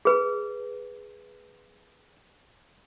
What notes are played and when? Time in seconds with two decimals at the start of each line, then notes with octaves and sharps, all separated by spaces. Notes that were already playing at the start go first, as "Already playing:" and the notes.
0.05 G#4 B4